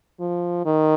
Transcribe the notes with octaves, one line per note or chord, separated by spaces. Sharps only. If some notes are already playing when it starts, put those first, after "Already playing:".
F3
D#3